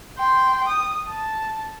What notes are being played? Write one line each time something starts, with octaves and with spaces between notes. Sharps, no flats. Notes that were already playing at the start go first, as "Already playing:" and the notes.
G5 C6
D#6
A5